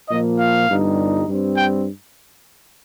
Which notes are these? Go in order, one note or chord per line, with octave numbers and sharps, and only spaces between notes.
A#2 F3 A#3 D#5
F5
G1 G2 G3 D#4
G2 G3 C4
G5